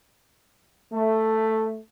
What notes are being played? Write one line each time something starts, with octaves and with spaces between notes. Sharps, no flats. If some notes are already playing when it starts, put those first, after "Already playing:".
A3